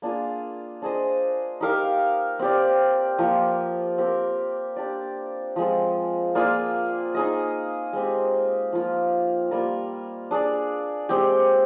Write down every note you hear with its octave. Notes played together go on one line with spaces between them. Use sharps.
A#3 D4 F4 G#4
D4 G#4 C5 D#5
D#4 G4 A#4 F5
C4 G4 D5
F3 A#3 F4
C4 G4 A#4
D4 G4 D5
F3 G#3 C4
A#3 F4 G#4 D5
D#4 G#4 D#5
G#3 C4 G4
F3 A#3 F4
G3 A#3 F4 A#4
D4 G#4 D5
G#3 C4 G4